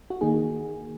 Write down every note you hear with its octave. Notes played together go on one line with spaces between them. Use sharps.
F#4
D#3 A#3 D#4 G#4